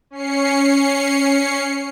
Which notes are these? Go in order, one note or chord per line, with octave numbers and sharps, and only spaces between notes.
C#4 C7 C#7